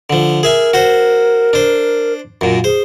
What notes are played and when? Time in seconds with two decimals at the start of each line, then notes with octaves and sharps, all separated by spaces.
0.10 D3 F3
0.43 G#4 A#4 E5 G#5
0.74 F#4 C5
1.53 D4 C5
2.41 F#2 A#2
2.64 G#4 C5